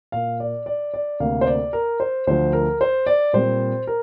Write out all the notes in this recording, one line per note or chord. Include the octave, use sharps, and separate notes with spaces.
A#2 A#3 F5
D5
D5
D5
D2 C3 A#3 F5
C5
D5
A#4
C5
D2 D3 F3 C5
A#4
C5
D5
A#2 G3 C4 C5
A#4